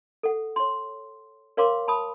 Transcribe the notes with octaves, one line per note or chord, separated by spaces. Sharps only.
A4 F#5
C#5 C6
A#4 C#5 F5 C6 D6
A5 B5 D#6